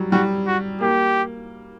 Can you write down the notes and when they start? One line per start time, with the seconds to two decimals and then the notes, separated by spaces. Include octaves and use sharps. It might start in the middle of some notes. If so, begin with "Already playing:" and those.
Already playing: F#3 G3
0.12 G3 F#4
0.47 F#4
0.80 A#3 G4